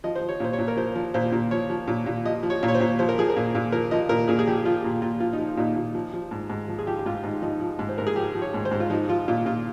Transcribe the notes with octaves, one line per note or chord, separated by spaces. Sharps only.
F3 D#5
C5
F3
C#5
A#2 C5
C#5
A#2
A#4
F3 C5
F3
A#2 C5
A#2
F3 C#5
F3
A#2
A#2
F3 D#5
F3
C#5
A#2
C#5
C5
A#2
F3 C5
A#4
F3 G#4
A#4
A#2
A#2
F3 A#4
F3 D#5
A#2 A#4
A#2 G#4
G#4
F3 G4
F3 F4
A#2
A#2 F4
F3 F4
D#4
F3
A#2 D#4
A#2
F3
F3
G#2
G#2
F3
G#4
F3 G4
G4
G#2 F4
G#2 D#4
F3 D#4
F3
G#2
C5
G#2 A#4
G#4
F3 G4
F3
C#5
G#2
C5
G#2
F4
F3 D#4
F3 F4
A#2 F4
A#2 F4